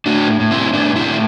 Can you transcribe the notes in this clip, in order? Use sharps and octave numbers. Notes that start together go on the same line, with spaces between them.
A2 D4 F#4
A2
C4 E4
A2 B3 D4
C4 E4
A2